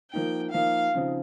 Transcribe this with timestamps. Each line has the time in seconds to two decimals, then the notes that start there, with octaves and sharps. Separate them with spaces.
0.13 F3 A#3 D#4 G5
0.53 F3 A#3 D#4 F5
0.95 C#3 F3 C4 D#4